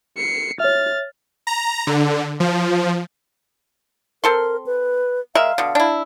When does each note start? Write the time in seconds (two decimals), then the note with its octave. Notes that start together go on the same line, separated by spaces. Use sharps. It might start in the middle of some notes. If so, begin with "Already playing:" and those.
0.17 C7 C#7
0.60 C#5 E5 F6 A6
1.47 A#5
1.87 D3
2.40 F3
4.24 C4 A4 A#4 C6
4.66 B4
5.35 G#3 A#4 E5 F5
5.58 B2 D3
5.75 D4 E4